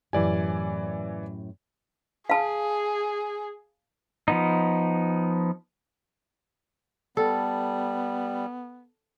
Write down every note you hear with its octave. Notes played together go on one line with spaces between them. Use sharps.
F#2 A2 E3 G4 D5 G#5
G#4 F5 A5
F3 B3 D#4
G3 B3 A4